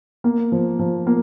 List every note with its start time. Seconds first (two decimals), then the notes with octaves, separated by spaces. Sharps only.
0.24 A#3
0.52 F3
0.79 F3
1.07 A#3